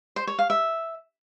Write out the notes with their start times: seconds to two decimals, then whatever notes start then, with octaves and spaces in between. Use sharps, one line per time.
0.16 C5
0.27 C#5
0.39 F5
0.50 E5